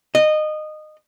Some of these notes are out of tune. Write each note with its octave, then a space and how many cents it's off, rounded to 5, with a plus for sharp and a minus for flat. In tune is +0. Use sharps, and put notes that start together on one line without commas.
D#5 -20